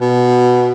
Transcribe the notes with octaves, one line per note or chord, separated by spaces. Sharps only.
B2